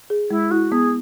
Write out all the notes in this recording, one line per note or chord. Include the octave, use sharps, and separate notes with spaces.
G#4
G#3 E4
E4 F#4
B3 G#4